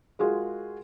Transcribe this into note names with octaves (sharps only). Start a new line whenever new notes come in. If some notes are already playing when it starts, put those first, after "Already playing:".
G#3 F4 F#4 G#4 A#4